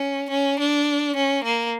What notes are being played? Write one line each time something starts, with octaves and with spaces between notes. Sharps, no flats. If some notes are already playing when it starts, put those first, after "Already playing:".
Already playing: C#4
C#4
D4
C#4
A#3